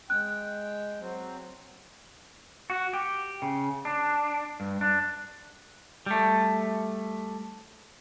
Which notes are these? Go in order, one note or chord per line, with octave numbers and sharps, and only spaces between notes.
G#3 G5 F#6
F#3 C4
F#4
G4
C#3
D4
G2
D4
G3 A3